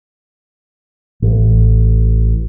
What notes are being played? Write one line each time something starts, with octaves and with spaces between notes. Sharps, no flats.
A1